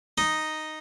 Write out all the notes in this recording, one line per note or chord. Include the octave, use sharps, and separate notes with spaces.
D#4 D#5